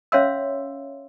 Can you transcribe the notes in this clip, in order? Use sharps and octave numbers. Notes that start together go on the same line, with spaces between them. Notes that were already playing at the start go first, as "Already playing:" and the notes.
C#4 C#5 E5 F5 C6 E6